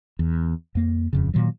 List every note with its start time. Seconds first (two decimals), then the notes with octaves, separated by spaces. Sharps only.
0.19 E2
0.75 F2 A#3
1.13 D#1 F2 C#3
1.34 A#2 D#3 F#3